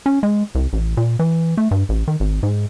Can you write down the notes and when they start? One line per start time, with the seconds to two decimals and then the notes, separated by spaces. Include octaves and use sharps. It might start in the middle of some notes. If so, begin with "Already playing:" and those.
0.06 C#4
0.23 G#3
0.55 C2
0.73 A1
0.97 A#2
1.19 E3
1.57 A3
1.71 G2
1.89 A1
2.08 D#3
2.20 G#1
2.43 G#2